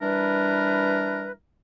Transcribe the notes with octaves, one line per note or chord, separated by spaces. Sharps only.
E3 G3 D4 A#4 B4